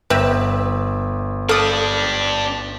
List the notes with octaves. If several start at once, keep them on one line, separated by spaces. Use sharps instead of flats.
G1 C4 B4 E5
A#3 D4 G4 A4 D#6